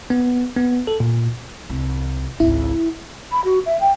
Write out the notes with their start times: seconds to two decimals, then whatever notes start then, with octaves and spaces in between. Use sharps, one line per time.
0.10 B3
0.57 B3
0.87 A4
1.00 A#2
1.69 C2
2.40 G#1 C#2 E4
3.32 B5
3.44 F#4
3.66 E5
3.80 G5